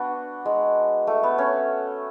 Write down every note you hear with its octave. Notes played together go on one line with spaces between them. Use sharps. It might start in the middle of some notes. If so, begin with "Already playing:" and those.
Already playing: B3 D4 F#4
G#3
A3
B3
C#4